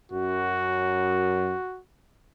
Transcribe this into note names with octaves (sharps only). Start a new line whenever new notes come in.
F#2 F#4